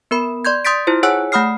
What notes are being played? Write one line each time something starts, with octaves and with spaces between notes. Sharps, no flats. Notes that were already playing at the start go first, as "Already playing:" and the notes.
B3 A#4 B5
D5 C6 G6 G#6
C6 D#6 G6 A6 B6 D7
E4 F4 C5
G#4 C#5 F#5 G#5 E6 F#6
A3 F#5 B5 D#6 F6 C7